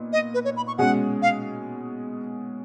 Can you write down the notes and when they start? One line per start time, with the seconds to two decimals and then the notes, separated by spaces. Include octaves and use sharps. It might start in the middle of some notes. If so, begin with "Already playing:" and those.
Already playing: A#2 B3 D#4
0.13 D#5
0.34 B4
0.45 C#5
0.57 B5
0.67 C#6
0.78 B2 G#3 C#4 G#4 F#5
1.22 F5